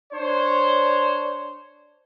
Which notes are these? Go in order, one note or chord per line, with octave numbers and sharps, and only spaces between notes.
D4 C5 C#5